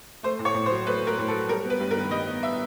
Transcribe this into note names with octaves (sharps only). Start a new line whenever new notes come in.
A3 C5
A2
C#5
A2
C5
F#3
A3 B4
A2 A#4
A2
A4
F#3
G3 A#4
B3
B4
G2
A#4
D#3
G3 D#5
B3
E5